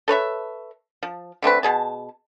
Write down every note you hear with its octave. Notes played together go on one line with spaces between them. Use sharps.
A4 B4 C#5 E5
F3
D3 A3 C4 B4
B2 G#4 A5